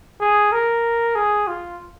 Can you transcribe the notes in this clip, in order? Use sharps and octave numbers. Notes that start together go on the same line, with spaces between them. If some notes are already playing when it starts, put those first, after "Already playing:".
G#4
A#4
G#4
F4